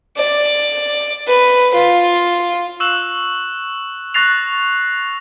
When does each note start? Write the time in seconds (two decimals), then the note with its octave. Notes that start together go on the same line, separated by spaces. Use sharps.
0.17 D5
1.28 B4
1.74 F4
2.80 C#6 E6 F#6 E7 F#7
4.14 C#6 F#6 A6 A#6 C7 F7